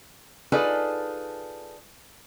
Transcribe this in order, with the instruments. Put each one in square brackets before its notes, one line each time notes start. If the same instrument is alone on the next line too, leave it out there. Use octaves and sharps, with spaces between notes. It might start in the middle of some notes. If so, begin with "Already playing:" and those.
[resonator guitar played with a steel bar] D#4 F4 G#4 A4 B4 D5